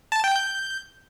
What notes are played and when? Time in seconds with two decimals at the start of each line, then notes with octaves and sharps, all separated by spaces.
0.12 A5
0.24 G5
0.36 G6